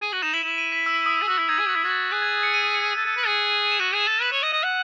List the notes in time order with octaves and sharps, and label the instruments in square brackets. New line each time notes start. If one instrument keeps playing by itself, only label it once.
[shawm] G#4 [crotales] D#7
[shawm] F#4 [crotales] F#7
[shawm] D#4 [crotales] E7
[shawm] E4 [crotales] F#7
[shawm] E4 [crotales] E7
[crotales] D#7
B6
E6
D#6
[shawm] G#4
[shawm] F#4 [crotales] E6
[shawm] E4
[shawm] D#4 [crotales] G#6
[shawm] G#4
[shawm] F#4 [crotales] B6
[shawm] E4
[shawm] F#4 [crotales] G#6
[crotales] A6
[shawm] G#4 [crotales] F#6
[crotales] G#6
C#7
D#7
C#7
[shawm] A4
A4
B4
G#4
[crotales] E7
[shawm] F#4 [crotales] D#7
[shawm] G#4
[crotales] E7
[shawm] A4
[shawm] B4 [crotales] F#7
[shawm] C#5
[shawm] D#5 [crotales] F#7
[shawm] D#5
F#5